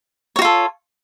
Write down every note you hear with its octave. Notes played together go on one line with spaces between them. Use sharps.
F4 F#4 A4 C#5